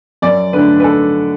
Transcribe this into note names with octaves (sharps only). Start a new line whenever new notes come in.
F#2 D5
D3 A3 D4 B4
B4
A4